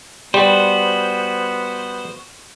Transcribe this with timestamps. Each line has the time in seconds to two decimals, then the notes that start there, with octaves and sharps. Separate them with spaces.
0.34 G3 B3 F#4 C5